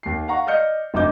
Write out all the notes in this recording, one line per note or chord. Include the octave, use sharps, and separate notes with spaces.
D#2 C7
F5 F#5 A#5 C#6
D5 D#5 F6 G6 C#7
F1 F#2 D4 D#5 D6 G6